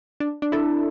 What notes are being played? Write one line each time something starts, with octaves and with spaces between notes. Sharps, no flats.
D4
D4
E4 A4